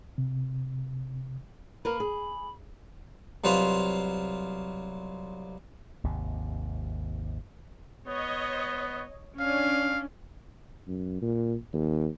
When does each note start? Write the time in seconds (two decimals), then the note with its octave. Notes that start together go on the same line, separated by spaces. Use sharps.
0.18 C3
1.85 A#3 A#4 B4 B5
2.00 G#4
3.44 C2 F#3 F4 B4 C5 F5
6.04 G#1 D#2 C3
8.07 B3 C#5 D#5
9.40 C#4 D4 F5
10.88 F#2
11.22 A#2
11.73 D#2